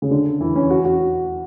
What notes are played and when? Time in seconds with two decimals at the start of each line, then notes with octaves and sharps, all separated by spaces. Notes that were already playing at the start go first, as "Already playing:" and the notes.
0.02 C#3
0.11 D3
0.41 E3
0.56 C#4
0.70 F#4
0.85 F#4